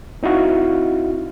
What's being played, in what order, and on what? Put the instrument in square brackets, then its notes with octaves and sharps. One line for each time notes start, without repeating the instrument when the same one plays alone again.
[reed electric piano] C4 D#4 E4 F#4 F5